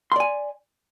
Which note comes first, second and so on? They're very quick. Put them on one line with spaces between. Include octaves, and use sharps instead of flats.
C6 D5 G#5